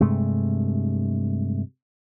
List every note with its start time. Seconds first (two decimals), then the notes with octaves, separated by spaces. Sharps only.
0.01 G2 C3 G#3 A3